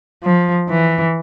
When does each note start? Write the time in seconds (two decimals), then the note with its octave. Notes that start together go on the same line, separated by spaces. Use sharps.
0.23 F3
0.69 E3